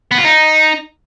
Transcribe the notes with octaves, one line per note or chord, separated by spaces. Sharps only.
B3
F4
D#4